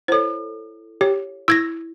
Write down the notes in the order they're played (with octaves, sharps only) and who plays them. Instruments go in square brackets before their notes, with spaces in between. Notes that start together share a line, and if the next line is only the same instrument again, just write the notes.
[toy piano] E4 A4 [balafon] C5 C#5
[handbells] G4 [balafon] C#5
[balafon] E4 [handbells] E6 G#6 A#6